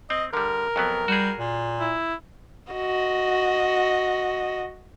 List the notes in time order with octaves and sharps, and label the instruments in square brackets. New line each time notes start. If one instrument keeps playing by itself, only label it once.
[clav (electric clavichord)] C4 [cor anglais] D#5
[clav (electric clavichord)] D3 G3 [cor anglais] A#4
[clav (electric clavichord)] F2 F#3 B3
[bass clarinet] G3 [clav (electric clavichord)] F#4 G#4
[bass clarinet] A#2
[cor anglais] E4
[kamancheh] F#4 D#5